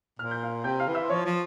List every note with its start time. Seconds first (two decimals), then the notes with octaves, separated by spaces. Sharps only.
0.19 A#2 F6
0.31 G6
0.43 F5 F6
0.64 C3 G5 G6
0.80 F5 F6
0.87 E3
0.95 E5 E6
1.03 C6
1.10 F3 C#5 C#6
1.25 F3